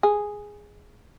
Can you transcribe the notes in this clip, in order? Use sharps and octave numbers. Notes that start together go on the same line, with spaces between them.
G#4